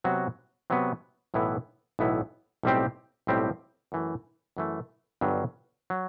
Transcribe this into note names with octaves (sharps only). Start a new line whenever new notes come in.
C3 F#3 B3 F#4
C3 F#3 B3 F#4
B1 A2 E3 B3 E4
B1 A2 E3 B3 E4
B1 A2 G3 C4 G4
B1 A2 G3 C4 G4
F#2 E3 A3
F#2 E3 A3
G1 G2 F#3
F#3